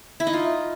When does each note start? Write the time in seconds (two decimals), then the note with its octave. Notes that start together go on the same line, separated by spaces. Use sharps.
0.20 E4
0.27 D#4
0.33 F4